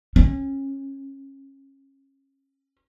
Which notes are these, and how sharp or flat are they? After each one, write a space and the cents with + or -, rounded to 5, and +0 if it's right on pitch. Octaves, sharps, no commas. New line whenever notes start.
C#4 -25